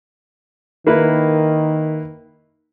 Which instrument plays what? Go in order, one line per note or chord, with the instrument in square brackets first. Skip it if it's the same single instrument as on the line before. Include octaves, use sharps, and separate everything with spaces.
[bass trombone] D#3 [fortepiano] A#3 E4 B4